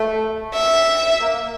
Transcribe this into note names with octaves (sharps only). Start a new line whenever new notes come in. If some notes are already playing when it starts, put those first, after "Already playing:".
Already playing: A3
E5
A#3